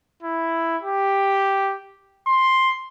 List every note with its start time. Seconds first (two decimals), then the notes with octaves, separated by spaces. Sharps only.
0.23 E4
0.82 G4
2.27 C6